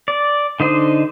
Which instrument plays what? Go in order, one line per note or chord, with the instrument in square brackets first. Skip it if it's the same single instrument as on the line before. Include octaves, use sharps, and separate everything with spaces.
[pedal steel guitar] D5
D3 D#4 C5 D#5